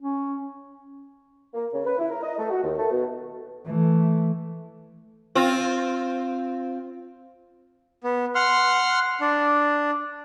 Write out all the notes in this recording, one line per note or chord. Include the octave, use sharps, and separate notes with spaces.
C#4
A#3
C#3
B4
E4
A#4
D#5
A3
F#4
D#2
A3
B2
E3 A3
C4 F4
B3
F#5 C6 F6
D4